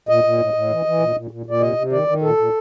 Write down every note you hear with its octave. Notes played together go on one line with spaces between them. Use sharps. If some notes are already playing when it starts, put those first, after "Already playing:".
A#2 D#5
A#2
A2
A2
E3
E3
A#2
A#2
A#2
A#2 D5
C3 D#5
C3
D#3 D5
D#3
A#2 A4
A#2